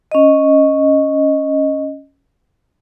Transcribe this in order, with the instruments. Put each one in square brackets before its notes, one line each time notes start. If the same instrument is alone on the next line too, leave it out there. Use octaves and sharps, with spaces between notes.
[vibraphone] C#4 D#5